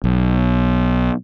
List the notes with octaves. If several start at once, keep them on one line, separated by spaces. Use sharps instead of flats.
B1